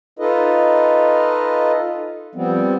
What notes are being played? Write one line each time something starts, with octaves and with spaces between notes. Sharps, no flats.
D#4 F4 A4 B4 D#5
F3 G3 B3 C4